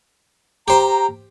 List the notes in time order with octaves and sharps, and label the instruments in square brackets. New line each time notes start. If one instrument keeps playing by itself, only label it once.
[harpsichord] G4 C5 [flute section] A#5